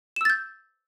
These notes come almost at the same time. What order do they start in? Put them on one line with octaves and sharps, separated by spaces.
E7 E6 A6 G6